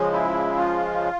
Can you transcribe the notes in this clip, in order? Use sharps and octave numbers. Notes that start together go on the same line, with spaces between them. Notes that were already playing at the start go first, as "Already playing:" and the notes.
Already playing: C#3 F3 G#3
E4
F4